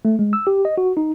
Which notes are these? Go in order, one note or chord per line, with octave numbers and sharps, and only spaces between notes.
A3
G#3
E6
G4
D#5
F#4
D#4